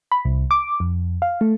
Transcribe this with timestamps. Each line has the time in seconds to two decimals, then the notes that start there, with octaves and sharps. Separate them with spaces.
0.12 B5
0.25 C2
0.51 D6
0.80 F2
1.22 F5
1.41 A3